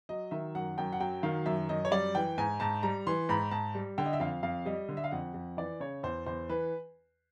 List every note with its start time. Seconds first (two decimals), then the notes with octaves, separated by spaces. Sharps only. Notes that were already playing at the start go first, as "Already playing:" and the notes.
0.09 F#3 D#5
0.31 D#3 E5
0.55 F#2 F#5
0.78 F#2 G5
0.93 F#5
1.00 F#3 G5
1.23 D#3 F5
1.46 F#2 E5
1.69 F#2 D#5
1.85 C#5
1.91 G3 D5
2.15 E3 G5
2.38 G#2 G#5
2.60 G#2 A5
2.83 G3 A#5
3.07 E3 C6
3.29 G#2 B5
3.51 G#2 A5
3.75 G3
3.98 D3 G5
4.06 D#5
4.13 E5
4.20 F2 F5
4.43 F2 F5
4.65 G3 D#5
4.89 D3
4.97 E5
5.04 F5
5.11 F2 F#5
5.34 F2
5.57 E3 D5
5.80 C#3 C#5
6.03 E2 C5
6.26 E2 C5
6.50 E3 B4